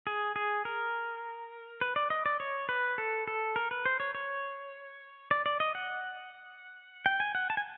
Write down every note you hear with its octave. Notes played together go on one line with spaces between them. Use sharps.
G#4
G#4
A#4
B4
D5
D#5
D5
C#5
B4
A4
A4
A#4
B4
C5
C#5
C#5
D5
D5
D#5
F#5
G5
G#5
F#5
A5
G#5